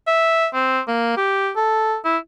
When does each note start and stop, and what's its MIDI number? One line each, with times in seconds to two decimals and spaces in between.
0.07 0.47 76
0.54 0.80 60
0.88 1.16 58
1.17 1.51 67
1.56 1.97 69
2.05 2.17 64